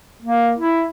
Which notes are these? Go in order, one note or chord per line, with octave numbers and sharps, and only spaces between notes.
A#3
E4